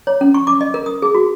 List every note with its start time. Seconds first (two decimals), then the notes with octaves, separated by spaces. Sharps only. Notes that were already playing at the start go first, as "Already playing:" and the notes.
0.07 C#5
0.21 C#4
0.34 C#6
0.47 D6
0.61 D#5
0.74 A#4
0.86 D#6
1.02 G#4
1.15 F#4